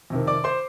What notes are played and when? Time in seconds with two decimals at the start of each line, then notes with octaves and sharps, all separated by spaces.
0.10 F2 C3 D#3
0.27 D5 D6
0.44 C5 C6